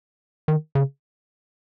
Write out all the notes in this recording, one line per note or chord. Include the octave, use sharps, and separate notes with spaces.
D#3
C#3